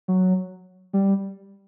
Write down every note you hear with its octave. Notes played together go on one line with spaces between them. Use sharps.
F#3
G3